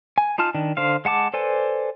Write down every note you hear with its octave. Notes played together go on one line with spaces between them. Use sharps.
G#5
D#4 F4 A5 F6
D#3 D4
D3 C5 F5
G#3 F#5 A5 D6
A4 B4 C5 D5 G#5